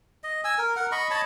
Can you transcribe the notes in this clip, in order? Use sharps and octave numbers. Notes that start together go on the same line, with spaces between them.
D#5
G#5 E6
A#4
A#4 F#5
D#5 B5 C#6
C#5 D#5 A5 B5